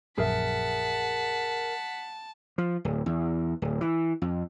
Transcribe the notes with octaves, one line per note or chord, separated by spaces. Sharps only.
A#1 F#2 G#4 A#4 E5 F#5 A5 B6
F3
D1
E2
D1
E3
F2